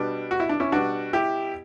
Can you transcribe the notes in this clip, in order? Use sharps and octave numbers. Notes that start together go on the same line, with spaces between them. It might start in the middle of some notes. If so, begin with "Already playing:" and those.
Already playing: B2 G3 B3 D4
F#4
E4
D4
C#4 E4
B2 G3 B3 D4 F#4
E4 G4